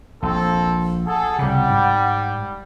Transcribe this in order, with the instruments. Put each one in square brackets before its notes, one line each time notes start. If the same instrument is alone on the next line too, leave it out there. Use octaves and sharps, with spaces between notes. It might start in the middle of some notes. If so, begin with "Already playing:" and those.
[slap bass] A#1 [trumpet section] C4 A4
[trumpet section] G#4 A4 [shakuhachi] F#5
[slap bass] C2 C#3 [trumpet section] G3
[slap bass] G#2